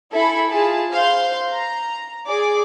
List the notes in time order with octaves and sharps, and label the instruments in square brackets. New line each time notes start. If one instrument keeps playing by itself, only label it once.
[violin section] E4 A4 E5 G#5 B5
F4 G#4 A5
C5 F5 C6 G6
A#5
G#4 D5 D6